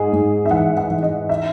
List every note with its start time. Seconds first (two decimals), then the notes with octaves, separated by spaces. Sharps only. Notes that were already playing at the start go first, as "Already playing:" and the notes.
Already playing: G#2 G#4
0.13 G#2
0.46 E5
0.51 E3 F#5
0.77 F#5
0.90 E3
1.03 D#5
1.29 E5